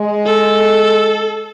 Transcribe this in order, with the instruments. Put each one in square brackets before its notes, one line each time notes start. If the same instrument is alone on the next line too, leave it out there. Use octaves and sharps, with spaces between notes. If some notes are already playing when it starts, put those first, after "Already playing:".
Already playing: [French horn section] G#3
[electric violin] A4